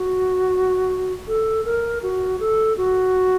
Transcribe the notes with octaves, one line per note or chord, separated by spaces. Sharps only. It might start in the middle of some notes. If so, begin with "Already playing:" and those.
Already playing: F#4
A4
A#4
F#4
A4
F#4